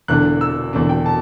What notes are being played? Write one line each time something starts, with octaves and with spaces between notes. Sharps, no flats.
E1 E2 D3 A3 D4 F#6
E6
E1 E2 D3 A3 D4
G5
A5